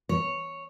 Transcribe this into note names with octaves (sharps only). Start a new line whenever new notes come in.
C#5